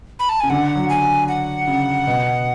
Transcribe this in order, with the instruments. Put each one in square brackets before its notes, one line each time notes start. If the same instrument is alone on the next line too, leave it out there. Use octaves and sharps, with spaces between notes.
[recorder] B5
A5
[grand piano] C#3 [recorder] G#5
[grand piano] D3 [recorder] F#5
[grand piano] F#3
[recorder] G#5
F#5
[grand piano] C#3
B2